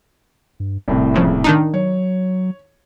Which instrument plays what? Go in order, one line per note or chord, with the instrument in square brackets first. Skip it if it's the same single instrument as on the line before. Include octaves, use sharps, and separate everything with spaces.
[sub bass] G2
[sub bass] D#1 [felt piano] C2 A2 C3
[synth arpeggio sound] A#2 C#3 F3
D#3 D4 D#4
[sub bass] F#3 [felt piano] C#5